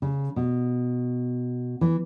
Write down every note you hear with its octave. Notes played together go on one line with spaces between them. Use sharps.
C#3
B2
E3